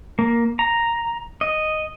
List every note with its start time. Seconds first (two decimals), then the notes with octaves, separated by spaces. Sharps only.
0.19 A#3
0.59 A#5
1.41 D#5